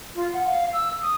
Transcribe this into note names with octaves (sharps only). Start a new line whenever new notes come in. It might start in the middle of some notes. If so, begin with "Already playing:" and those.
F4
F#5
F5
E6
D#6